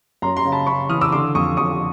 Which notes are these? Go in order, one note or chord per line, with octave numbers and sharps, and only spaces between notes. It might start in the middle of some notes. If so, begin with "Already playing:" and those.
F#2 A#5 C6
A#5 C6
C#3
A5 B5
C#3 B5 C#6
E3 D#6 F6
D6 E6
D3 C6 D6
F2 C#6 D#6
F2 C#6 D#6